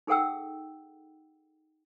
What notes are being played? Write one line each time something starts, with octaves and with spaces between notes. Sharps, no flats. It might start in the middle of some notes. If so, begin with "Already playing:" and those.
D#4 G#4 A4 F#5 G5 E6